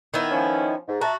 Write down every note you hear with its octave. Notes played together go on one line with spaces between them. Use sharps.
D#3 B3 E4
F3 C#4
G#2
F#4 E5 A5 A#5